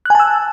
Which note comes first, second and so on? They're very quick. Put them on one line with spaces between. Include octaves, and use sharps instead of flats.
F#6 G#5 A5 E6